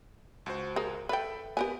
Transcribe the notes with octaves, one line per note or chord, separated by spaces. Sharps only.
C#2 F#4 C5
G#4 A#4
A4 B4 E5 G5 B5
B3 G4 A#4 B4 G#5